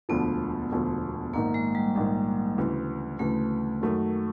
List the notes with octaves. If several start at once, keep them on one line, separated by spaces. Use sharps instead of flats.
E1 D2 D3 F3 B3
E1 D2 D3 F3
A#1 G#2 D#3 A#3
G#3
G3
A#1 G#2 D#3
D2 C#3 E3
D2 C#3 E3 A3
F#2 D#3 F#3 A3 C#4